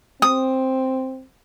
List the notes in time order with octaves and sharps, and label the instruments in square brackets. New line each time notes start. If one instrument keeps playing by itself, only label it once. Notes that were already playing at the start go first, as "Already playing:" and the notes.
[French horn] C4 [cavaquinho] D#6